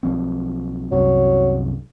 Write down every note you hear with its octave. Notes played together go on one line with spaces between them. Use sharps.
B1 F3 C4
C2 F#2 C3 F#3